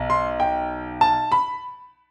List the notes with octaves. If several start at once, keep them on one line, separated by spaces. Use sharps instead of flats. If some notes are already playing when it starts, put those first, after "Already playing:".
Already playing: B1
C6
G5
A5
B5